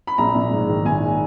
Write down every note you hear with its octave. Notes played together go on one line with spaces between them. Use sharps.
B5
A#1 A#5
A#1
G#2
D#3
A#1 G#5